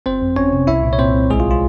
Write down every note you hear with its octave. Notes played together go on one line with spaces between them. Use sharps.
G1 C4 C5
F2
G1 C#4 C#5
C3
C2 E4 E5
A#2
C#5
A#2 C4 C5
C2
A#1 G#3 G#4
F4
F4